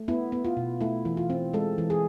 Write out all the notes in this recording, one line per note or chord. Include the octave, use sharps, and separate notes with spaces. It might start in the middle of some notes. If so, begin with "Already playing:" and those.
Already playing: A3
B3 E4
B3
F4
B2
A3 E4
E3
F4
C4
G#3 A4
E3
G#4